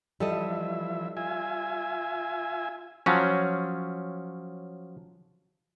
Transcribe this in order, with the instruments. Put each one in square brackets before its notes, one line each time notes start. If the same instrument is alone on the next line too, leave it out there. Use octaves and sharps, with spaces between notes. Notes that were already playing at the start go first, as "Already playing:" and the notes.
[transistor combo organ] E3 F3 E5 [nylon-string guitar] G3 A4 D#5
[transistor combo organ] F4 E5 G#5
[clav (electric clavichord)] F3 F#3 C#4